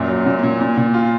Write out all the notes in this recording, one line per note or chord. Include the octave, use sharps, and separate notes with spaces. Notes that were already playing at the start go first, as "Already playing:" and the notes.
Already playing: F#2 A#2
F#3
A#2
A#2
A#2
A#2
F4